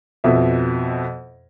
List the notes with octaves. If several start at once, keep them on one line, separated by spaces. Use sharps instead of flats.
F2 B2 E5